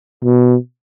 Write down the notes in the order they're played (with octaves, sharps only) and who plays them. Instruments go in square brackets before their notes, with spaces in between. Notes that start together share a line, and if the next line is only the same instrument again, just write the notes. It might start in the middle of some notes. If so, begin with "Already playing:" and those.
[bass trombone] B2